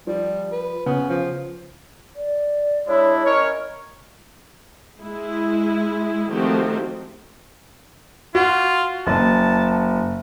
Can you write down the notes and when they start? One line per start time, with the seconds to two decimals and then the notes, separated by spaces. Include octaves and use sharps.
0.07 F3 G3
0.52 B4
0.86 C#3 B3
1.10 F3
2.16 D5
2.87 G#3 D4 E4 C#5
3.24 C#4 A#4 C#5 D#5
5.00 G#3 E4
6.30 D#3 F3 A3 C4 F#4 G4
8.35 F4 F#4
9.07 F#1 A5